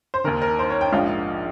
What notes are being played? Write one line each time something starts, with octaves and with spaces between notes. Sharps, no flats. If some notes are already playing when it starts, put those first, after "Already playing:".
C5
D#2 D#3 A#4
A#4
C5
C#5
G5
A#1 G#2 F3 F5